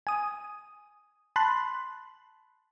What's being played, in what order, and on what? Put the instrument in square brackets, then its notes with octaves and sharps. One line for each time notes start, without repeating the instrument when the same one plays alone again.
[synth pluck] G#5 D#6
A5 B5 C6 F#6